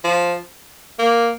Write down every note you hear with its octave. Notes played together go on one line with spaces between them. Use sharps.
F3
A#3